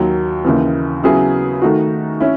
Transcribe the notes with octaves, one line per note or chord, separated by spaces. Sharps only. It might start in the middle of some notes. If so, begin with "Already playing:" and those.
Already playing: D#2 D#3 F#3
D#2 C#3 E3
C#3 F#3 B3 E4 G#4
D#3 A3 D#4 F#4
C#4 E4